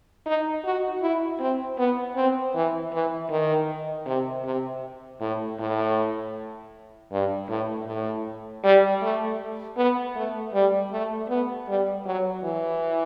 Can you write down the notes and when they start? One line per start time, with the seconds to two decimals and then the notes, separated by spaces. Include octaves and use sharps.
0.26 D#4
0.64 F#4
1.02 E4
1.40 C4
1.78 B3
2.16 C4
2.55 E3
2.93 E3
3.30 D#3
4.06 C3
4.45 C3
5.20 A2
5.59 A2
7.12 G2
7.49 A2
7.87 A2
8.64 G3
9.02 A3
9.77 B3
10.16 A3
10.54 G3
10.92 A3
11.29 B3
11.68 G3
12.06 F#3
12.44 E3